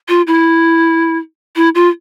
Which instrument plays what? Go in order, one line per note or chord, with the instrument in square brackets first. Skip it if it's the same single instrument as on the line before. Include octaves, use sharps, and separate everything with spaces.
[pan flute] F4
E4
E4
F4